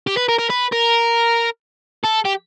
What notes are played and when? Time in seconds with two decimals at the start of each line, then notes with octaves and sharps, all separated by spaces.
0.07 G4
0.17 B4
0.29 A#4
0.39 A#4
0.50 B4
0.72 A#4
2.04 A4
2.25 G4